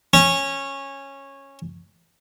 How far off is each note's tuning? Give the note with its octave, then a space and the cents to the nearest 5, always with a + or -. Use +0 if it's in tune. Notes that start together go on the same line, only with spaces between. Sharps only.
C#4 -15